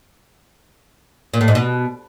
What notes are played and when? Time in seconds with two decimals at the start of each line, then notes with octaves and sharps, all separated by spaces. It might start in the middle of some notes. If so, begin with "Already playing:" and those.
1.34 A#2
1.41 A2
1.48 G#2
1.55 B2